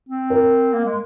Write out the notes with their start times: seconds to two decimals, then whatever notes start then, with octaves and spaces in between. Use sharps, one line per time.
0.09 C4
0.30 A#4
0.73 A#3
0.85 G#3